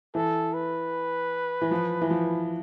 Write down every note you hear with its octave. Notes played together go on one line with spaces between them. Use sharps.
E3 A4
B4
E3
F3
E3
F3